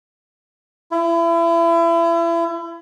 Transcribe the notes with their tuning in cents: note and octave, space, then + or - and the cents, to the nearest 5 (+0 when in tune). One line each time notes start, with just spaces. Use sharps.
E4 +35